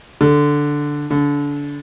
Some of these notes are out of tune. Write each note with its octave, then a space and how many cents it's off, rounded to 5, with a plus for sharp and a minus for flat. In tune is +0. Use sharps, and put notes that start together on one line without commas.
D3 +0
D3 -25